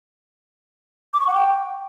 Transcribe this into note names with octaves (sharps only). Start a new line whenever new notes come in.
D6
C#6
F#5
G5